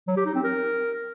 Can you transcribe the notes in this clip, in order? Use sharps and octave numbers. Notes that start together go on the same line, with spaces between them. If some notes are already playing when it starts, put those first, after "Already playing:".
F#3
G4
D#4
C4
A#4